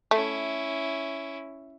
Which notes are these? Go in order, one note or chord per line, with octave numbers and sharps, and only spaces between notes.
A3 C#4 E4